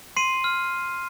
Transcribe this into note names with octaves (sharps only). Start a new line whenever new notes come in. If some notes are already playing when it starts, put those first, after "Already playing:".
C6 C7 D#7
F6